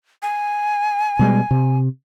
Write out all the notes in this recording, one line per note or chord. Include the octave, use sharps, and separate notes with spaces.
G#5
B2 G3 G#3
C3